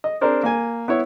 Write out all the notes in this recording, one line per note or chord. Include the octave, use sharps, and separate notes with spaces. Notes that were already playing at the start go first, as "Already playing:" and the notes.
D#5
C4 D4 G#4 A#4 C5 D5
A#3 G#5
B3 E4 C#5